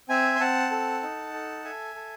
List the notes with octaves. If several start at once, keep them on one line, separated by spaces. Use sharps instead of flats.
C4 E5 G#5
C6
C4 F#5 A5
A4
D#4
A4
A4 E5 G#5
A4